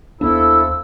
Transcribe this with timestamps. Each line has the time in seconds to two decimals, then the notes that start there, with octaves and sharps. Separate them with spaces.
0.21 D#2 F3 B3 D4 E4 A4 E6